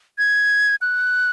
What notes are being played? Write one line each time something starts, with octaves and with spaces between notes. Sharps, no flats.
G#6
F#6